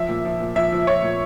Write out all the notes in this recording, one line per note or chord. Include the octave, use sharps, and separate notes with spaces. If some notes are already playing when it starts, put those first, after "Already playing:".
Already playing: F3 E5
A#2
F3
A#2
F3 E5
F3
F3 C#5
A#2